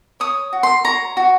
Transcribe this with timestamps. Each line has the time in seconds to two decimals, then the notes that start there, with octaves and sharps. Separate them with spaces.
0.20 C#5 D#6
0.53 F#4
0.63 C6
0.84 C#5 A#5
1.17 F#4